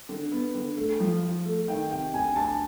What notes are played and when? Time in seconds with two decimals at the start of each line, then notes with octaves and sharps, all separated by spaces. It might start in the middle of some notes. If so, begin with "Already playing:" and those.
0.09 D3
0.32 B3
0.54 D3
0.77 A3
1.00 F3
1.23 F3
1.45 A3
1.68 D#3 G5
1.90 C3 G5
2.14 D2 G#5
2.36 D2 A5